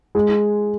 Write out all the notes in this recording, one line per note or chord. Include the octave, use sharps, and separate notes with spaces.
G#3